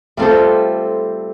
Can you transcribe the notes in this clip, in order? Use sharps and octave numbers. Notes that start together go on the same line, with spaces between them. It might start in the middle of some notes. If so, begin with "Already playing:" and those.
G3 A3 C4 F4 A4 C5